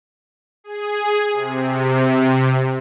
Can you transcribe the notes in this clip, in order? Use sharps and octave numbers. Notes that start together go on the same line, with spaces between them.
G#4
C3